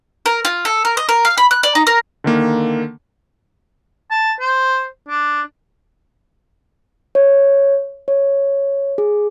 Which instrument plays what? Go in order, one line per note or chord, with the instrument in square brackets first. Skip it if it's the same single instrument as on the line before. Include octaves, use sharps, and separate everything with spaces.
[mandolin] A#4
F4
A4
A#4
D#5
A#4
F5
B5
F#6
D5
D#4
A#4
[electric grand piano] D3 D#3 A#3
[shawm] A5
C5
D4
[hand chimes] C#5
C#5
G#4